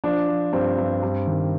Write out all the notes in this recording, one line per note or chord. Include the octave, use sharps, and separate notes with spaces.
F3 D4
F3
G2 C4
G2
G2
D#3